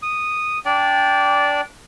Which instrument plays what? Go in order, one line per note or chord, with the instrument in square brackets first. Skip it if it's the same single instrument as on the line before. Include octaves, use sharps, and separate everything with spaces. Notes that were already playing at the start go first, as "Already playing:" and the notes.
[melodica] D#6
[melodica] D4 D5 [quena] G5